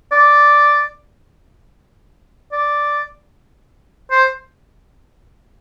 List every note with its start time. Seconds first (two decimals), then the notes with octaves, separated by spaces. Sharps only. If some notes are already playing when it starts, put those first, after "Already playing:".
0.12 D5
2.52 D5
4.11 C5